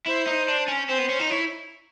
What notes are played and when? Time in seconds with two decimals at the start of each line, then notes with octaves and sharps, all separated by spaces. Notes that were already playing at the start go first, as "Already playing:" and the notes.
0.07 E4 C5
0.27 D#4
0.49 D4
0.68 C#4
0.89 C4 C5
0.98 B3
1.09 C#4
1.19 D#4
1.30 E4 C#5